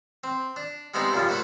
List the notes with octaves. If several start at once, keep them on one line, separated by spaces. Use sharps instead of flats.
C4
D4
G3 G#3 B3 C4 D#4 E4
F#2 A#2 C#3 F3 G3
F#3 A3 F#4 B4 C5